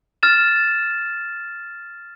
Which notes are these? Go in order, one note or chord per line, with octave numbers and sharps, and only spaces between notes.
F6 A6 E7